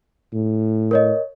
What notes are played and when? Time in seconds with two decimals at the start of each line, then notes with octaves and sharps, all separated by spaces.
0.33 A2
0.91 A#4 C#5 D#5